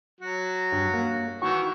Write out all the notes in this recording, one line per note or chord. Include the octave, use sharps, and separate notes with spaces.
F#3 F#4
G2
A#3
D#3 E3 F#4 C#6